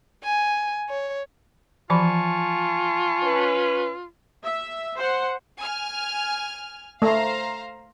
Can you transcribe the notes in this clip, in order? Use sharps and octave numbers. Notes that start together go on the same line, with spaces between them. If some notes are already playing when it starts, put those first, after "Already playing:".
G#5
C#5
E3 F3 F4 G#5 A5 B5 C#6
C#4 B4
E5
C5 F#5
G#5 F6
A3 C5 F5 A#5